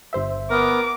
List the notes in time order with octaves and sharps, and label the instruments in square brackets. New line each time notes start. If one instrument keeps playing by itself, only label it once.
[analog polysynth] G1 C5 E5
[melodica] B3 [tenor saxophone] A#4 [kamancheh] D6